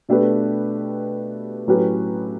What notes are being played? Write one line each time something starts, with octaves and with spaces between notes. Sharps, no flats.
B2 A3 D4 G4 B4
A2 F#3 C#4 G4 B4